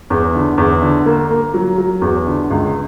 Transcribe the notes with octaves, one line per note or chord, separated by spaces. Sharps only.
E2
D3
E2
D3
A#3
A#3
F#3
F#3
E2
D3
C#2